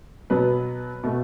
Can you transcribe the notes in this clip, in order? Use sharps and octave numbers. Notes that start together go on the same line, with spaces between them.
B2 F#3 B3 B4
B2 A3